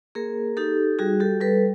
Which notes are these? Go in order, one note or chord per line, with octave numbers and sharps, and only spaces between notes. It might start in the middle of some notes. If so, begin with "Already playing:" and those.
A#3 G#4 A#4
D#4 G4 A4
G3 F#4 G#4
G4 A4
G3 A4 B4